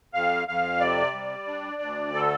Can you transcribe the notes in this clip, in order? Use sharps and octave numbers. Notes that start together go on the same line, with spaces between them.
F2 F5
F2 F5
C3 D5
G3
D4
D2
D3 A4